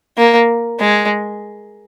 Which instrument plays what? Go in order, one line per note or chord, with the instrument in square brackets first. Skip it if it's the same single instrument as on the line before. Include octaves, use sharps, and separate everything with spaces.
[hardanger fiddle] A#3
G#3